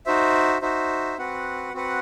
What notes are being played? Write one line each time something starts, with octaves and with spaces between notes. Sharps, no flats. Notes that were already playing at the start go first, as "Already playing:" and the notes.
D#4 F#4 C5 E5
D#4 F#4 C5 E5
C4 F#4 B4 F#5
C4 F#4 B4 F#5